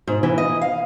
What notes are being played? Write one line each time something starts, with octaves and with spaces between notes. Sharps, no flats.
G#2
E3
D#5
F5